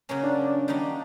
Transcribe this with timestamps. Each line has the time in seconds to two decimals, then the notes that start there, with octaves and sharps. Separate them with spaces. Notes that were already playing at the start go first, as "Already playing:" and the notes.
0.09 C#3 F#3 A#3 C#4
0.23 D4
0.68 D#3 G3 A#3 D#4 F#4